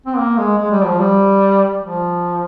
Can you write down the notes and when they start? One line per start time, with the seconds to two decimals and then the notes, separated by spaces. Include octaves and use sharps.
0.06 C4
0.17 A#3
0.38 G#3
0.58 G#3
0.71 G3
0.85 F3
0.99 G3
1.83 F3